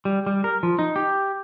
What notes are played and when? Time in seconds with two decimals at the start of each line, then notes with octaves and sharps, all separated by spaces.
0.05 G3
0.26 G3
0.44 A#4
0.63 F3
0.79 D#4
0.96 G4